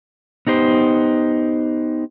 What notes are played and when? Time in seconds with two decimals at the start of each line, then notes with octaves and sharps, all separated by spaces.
0.47 B3 D#4 G4 C5